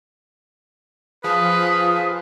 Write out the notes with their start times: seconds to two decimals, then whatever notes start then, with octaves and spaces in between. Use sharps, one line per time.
1.24 F3 G#4 B4 F5 D#6